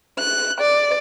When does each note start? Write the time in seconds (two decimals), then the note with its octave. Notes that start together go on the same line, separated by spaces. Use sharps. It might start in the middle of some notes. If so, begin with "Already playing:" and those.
0.19 F#6
0.60 D5